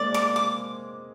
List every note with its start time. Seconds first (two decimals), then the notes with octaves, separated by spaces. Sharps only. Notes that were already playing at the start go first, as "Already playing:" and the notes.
Already playing: G#3 A#3 C4 D5
0.14 D6
0.36 D6